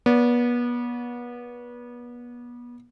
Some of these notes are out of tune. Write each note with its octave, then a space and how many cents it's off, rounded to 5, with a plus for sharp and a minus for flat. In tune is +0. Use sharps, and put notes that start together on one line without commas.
B3 -30 D5 -35